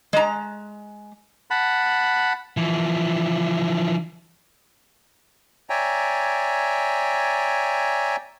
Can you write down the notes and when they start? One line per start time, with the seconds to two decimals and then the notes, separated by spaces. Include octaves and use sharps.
0.13 G#3 A#5
1.51 F#5 A5 B5
2.57 E3 F3
5.70 C#5 D5 E5 G5 G#5 A#5